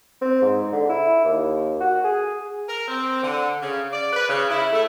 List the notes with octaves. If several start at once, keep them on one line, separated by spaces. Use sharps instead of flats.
C4
G#2
D3
E4
D#2
F#4
G#4
A#4
C4
D3
C#3
D5
B4
C#3
E4
A3